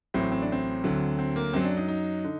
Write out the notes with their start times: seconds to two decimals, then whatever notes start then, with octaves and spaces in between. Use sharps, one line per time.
0.14 A1 A2 F#3 C4
0.32 C4
0.42 D4
0.52 C4
0.84 D2 D3 F#3
1.19 C4
1.36 A#3
1.53 F#2 F#3 C4
1.65 D4
1.77 D#4
1.88 D#4
2.25 D3